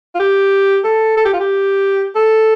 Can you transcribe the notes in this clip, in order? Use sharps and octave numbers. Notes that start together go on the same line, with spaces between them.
F4
G4
A4
A4
G4
F4
G4
A4